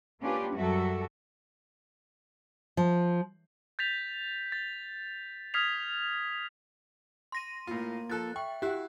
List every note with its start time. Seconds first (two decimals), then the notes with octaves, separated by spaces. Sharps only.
0.22 A#3 C#4 D4 F4 G4 B4
0.56 F#2 F#3 G3 F#4 A4 E5
2.77 F3
3.79 G6 A6 B6 F7
4.52 A6
5.54 D#6 F6 G#6 B6 C7 F7
7.32 C6 A#6 D#7
7.67 A2 A#3 F4
8.10 F3 A4 F#6 A6
8.36 E5 G5 C#6
8.62 E4 F#4 G4 F#6